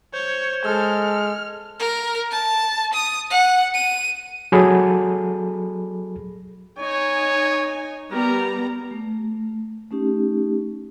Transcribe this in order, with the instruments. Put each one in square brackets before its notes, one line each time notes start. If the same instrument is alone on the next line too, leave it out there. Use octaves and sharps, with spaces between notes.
[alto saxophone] C5 [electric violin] C#5
[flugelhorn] G#3 [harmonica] A4 [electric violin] F6
[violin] A#4
A5
D#6
F#5
D#7
[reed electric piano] F#3 G#4 A4 B5
[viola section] D#4 G#5 [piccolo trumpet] C#5
[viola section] G3 B3 A#5 [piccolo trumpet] A#4
[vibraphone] A3
A3 C#4 D#4 G4